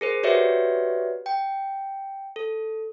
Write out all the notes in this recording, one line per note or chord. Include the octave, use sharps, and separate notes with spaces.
G#4 A#4 C5
F#4 G4 B4 C#5 D5 E5
G5
A4